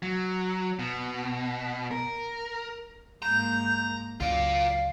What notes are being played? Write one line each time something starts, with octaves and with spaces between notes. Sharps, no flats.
F#3
B2
A#4
G#2 A#3 A#5 G6
C#2 F#2 F4 D5 F5